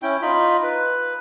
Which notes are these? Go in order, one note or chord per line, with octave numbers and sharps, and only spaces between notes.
C#4 E4 G5
D#4 F4 B5
B4